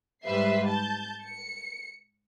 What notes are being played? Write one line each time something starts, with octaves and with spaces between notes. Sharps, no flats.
G#2 G3 B4 C5 E5 C7
A5 G6
C#7